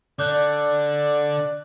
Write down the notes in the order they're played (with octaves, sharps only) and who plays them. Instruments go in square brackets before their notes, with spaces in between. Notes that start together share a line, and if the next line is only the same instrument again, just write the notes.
[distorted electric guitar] D3 [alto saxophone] D5 [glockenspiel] D6 F#6 G6